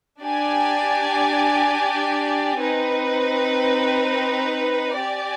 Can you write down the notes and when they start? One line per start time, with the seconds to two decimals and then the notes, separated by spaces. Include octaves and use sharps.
0.21 D4 G4 D5 G#5
2.59 C4 D#4 B4
4.97 G4 D5 G#5